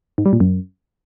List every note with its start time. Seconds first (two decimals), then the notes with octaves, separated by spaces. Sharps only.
0.18 G#2
0.25 G3
0.33 A#2
0.40 F#2